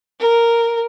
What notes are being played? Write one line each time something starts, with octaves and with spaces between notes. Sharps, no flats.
A#4